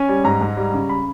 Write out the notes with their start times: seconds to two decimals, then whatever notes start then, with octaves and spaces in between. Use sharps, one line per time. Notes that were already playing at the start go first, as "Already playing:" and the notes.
Already playing: C#4 G#5
0.09 G3
0.24 G#2 A#5
0.41 G#2
0.57 G3
0.73 C#3
0.89 B5